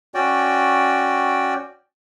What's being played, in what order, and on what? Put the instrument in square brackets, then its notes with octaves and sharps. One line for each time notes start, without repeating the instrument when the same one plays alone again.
[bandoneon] C#4 F#4 D5 G5